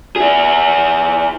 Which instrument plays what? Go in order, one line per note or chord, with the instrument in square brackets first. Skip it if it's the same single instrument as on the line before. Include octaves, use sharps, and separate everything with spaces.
[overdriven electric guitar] E4 G#4